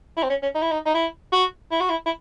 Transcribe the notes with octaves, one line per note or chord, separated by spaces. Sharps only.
E4
C4
C#4
C#4
D#4
E4
D#4
D#4
E4
F#4
E4
F#4
E4
E4